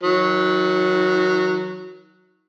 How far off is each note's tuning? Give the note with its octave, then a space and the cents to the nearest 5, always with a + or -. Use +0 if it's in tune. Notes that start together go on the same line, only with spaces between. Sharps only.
D#3 +35 F#3 -10